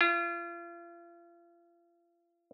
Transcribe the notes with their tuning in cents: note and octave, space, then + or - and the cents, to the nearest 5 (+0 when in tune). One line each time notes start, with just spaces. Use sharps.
F4 -35